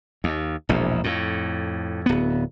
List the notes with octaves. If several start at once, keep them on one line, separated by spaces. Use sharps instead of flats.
D#2
E1 A#1 E2
F2 A2
D1 B3